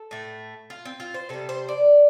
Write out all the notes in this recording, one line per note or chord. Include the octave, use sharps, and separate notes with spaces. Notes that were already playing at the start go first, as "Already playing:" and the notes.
Already playing: A4
A2 A3
F4
C4
F4
C5
C3 G3 A4
C5
D5